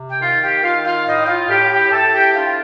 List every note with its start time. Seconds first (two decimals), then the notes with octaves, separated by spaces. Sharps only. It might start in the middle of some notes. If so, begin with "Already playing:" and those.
Already playing: C3
0.10 G5
0.21 D#3 F4 F5
0.42 G4 G5
0.64 D#3 F4 F5
0.81 G5
0.85 F4 F5
1.06 A2 D#4 D#5
1.23 G5
1.27 F4 F5
1.49 A2 G4 G5
1.71 G4 G5
1.92 A2 A4 A5
2.13 G4 G5
2.34 D4 F4 F5